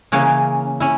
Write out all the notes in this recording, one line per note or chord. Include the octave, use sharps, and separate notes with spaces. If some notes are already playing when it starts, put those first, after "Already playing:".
C#3 E3 A#3 C#4 C#5
C#4 E4